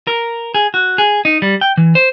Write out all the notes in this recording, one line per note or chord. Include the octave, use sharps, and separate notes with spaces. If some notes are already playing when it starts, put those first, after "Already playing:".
A#4
G#4
F#4
G#4
D#4
G3
G5
E3
C5